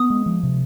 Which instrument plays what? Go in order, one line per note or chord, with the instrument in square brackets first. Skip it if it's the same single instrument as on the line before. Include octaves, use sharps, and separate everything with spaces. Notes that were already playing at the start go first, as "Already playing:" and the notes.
Already playing: [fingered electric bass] B3 [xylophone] D#6
[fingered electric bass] G#3
F3
C3